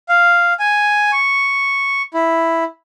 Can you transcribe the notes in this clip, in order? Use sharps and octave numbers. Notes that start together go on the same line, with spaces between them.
F5
G#5
C#6
E4